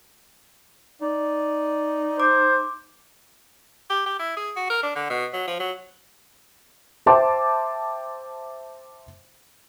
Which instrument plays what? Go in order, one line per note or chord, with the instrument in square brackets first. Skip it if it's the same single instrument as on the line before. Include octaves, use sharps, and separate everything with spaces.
[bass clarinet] D#4 [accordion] D5
[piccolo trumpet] C5 [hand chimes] D6
[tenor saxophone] G4
G4
E4
G#4
F#4
A#4
D4
D3
B2
F#3
F3
F#3
[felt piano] C5 E5 G5 A5 C6 D6